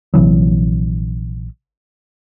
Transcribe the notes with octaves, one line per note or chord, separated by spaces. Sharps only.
A#1 C3 E3 F#3